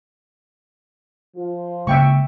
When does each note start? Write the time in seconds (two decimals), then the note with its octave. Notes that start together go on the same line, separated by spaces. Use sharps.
1.37 F3 F4
1.87 C#3 G#3 A#3 E5 G5 C#6